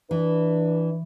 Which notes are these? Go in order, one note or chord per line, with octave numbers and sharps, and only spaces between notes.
E3 D4 B4